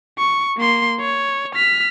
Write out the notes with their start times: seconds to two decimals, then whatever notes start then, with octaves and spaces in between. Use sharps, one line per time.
0.18 C#6
0.57 A#3 C6
1.00 C#5
1.56 F6 B6